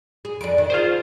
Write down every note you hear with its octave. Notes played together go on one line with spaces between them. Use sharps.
G#4
F2 D4 D7
D#3
F4 G#4 C5